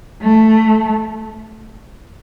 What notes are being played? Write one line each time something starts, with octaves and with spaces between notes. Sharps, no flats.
A3